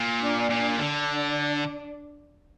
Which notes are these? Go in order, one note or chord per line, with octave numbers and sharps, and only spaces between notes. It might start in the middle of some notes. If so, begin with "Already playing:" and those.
Already playing: A#2
D4
A#2
D3 D4